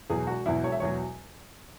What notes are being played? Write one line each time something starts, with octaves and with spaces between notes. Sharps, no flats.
E2 B2 F#3 G#4
E1 F#4
E2 B2 F#3 E4
E1 C#5
E5
E2 B2 F#3 C#5